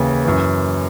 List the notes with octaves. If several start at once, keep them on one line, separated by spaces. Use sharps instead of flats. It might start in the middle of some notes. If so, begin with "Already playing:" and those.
Already playing: D#2 C#3 E3
F#2 E3